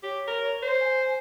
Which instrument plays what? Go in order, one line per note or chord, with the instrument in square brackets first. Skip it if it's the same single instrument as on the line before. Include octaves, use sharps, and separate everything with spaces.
[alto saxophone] G4 [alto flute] C#5
[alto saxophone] A#4
C5
[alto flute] G#5